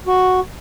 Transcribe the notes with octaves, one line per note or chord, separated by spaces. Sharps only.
F#4